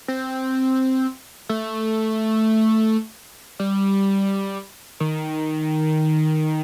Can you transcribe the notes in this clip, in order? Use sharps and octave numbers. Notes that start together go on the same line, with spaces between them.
C4
A3
G3
D#3